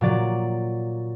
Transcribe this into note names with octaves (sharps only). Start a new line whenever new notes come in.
A#2 F#3 D5